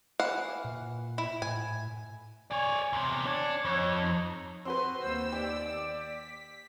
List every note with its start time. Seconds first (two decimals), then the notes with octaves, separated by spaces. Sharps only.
0.20 E3 F5 F#5
0.64 A#2
1.18 E4
1.42 A2 G#5
2.51 C#5 D5 G#5
2.93 E2 C3
3.26 D4 C#5
3.65 F2 C#5
4.02 D#4
4.65 C4 F#4 B4 C6
5.02 D#2 C5 E6
5.32 G4 D5
6.00 B6